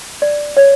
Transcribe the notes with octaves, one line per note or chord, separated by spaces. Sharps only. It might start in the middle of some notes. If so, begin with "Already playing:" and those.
D5
C#5